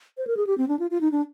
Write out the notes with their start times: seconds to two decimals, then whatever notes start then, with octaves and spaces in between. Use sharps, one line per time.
0.18 C5
0.27 A#4
0.37 G#4
0.47 G4
0.58 C4
0.68 D4
0.79 F4
0.91 F4
1.01 D#4
1.12 D4